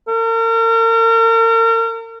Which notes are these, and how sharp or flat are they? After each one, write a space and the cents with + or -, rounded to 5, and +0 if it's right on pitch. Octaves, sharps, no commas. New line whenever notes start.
A#4 -40